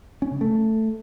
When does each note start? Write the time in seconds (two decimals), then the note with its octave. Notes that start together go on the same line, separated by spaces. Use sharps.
0.22 C#4
0.31 C#3
0.41 A3